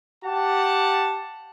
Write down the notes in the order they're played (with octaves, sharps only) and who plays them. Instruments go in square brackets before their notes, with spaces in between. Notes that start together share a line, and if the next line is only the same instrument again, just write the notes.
[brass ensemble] G4 F#5 A5